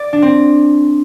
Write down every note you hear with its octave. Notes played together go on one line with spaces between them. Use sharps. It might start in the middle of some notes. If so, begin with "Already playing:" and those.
Already playing: D5
D4
C4